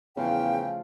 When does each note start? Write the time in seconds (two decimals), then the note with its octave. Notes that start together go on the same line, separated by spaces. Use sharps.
0.17 E2 C#3 F3 A3 F4 G5